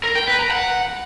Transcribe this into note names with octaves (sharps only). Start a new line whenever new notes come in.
A#4
G5
B4
A#5
F#5